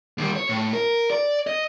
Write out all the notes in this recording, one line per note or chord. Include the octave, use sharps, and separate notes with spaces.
D#2 G3
C#5
A2
A#4
D5
D#5